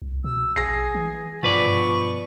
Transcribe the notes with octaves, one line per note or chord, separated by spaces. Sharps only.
C2
B2 E6
A#1 G#4 A#6 C7
E3
G2 B2 F3 B4 D5 C#6
G2